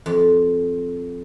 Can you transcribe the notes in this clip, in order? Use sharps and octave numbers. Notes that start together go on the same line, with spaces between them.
F2